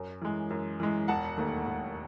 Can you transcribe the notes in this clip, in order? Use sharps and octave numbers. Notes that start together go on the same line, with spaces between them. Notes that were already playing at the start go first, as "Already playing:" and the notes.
Already playing: F#2
E3 G#3
F#2
E3 G#3
E1 F#5 A5
D#2 D#3 A3
E1